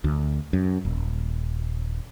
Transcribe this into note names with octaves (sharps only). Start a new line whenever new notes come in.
D2
F#2
D#1